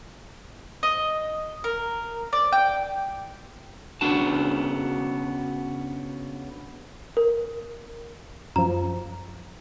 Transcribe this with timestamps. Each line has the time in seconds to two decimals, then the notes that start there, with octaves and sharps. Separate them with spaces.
0.83 D#5
1.64 A#4
2.33 D5
2.53 G5
4.01 C#3 B3 D4 F#4 A5
7.17 A#4
8.56 F#2 F3 A#5